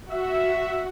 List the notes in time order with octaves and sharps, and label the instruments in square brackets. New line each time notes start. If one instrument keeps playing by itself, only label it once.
[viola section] F#4 [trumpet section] E5